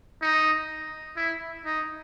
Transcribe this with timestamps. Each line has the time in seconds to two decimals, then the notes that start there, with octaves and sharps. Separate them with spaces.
0.22 D#4
1.17 E4
1.65 D#4